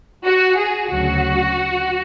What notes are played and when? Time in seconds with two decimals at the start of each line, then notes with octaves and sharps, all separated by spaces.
0.24 F#4
0.58 G#4
0.90 D2 C#3 F#3 F#4